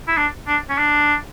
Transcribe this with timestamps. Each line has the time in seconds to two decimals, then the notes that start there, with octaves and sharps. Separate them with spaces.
0.07 E4
0.17 D4
0.47 D4
0.69 C#4
0.78 D4